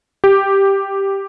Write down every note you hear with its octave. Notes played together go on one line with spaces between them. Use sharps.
G4